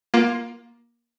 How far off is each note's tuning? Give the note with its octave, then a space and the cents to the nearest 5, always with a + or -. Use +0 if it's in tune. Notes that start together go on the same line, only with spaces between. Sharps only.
A#3 +20 F4 +0